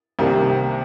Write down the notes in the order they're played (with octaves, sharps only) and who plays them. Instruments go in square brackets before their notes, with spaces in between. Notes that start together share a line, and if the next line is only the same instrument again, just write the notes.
[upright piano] C2 C3 D#3 A#3